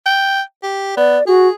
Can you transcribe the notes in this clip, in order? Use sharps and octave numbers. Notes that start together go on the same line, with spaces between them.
G5
G4
B3 D5
F#4 G#4